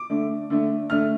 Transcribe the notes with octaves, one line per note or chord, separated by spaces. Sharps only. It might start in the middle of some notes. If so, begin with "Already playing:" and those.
Already playing: D6
D3 A3
D3 A3
D3 A3 F6